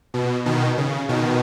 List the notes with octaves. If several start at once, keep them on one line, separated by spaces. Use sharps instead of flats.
B2
B2 D#3
C#3
B2 D#3